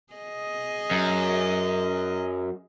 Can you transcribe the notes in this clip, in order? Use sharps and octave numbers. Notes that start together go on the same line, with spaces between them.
G#4 D#5
F#2